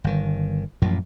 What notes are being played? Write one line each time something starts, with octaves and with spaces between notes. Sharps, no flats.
G1 D#3
A1 F#2 A#2 F3